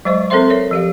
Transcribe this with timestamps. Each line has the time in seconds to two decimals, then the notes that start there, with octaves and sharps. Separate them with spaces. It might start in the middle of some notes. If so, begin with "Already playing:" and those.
0.05 F#3 G#3 C5 D#5 C#6
0.30 C4 A4 A#4 C5 E5 C6
0.50 A#4 C#5 E5
0.71 F3 G4 F5